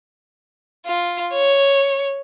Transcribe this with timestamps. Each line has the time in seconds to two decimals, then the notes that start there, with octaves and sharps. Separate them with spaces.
0.86 F4
1.33 C#5